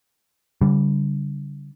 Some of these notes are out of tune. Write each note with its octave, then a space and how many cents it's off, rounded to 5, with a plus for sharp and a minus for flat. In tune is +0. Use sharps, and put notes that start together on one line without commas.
D3 -40 G3 +0